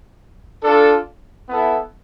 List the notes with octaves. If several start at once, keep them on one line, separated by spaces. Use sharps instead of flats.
D4 F4 A4
B3 E4 A4